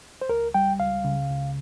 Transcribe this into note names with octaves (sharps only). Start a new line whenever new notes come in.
C5
C#2 A#4
G3 G5
C#2 F5
C#3
C#2